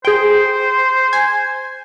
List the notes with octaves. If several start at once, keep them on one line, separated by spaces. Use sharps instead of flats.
G#4 C5 G5
G#5